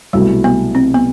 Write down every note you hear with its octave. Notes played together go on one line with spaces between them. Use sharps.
C2 B2 F#3 G3 A3 E4
B3
C4
B3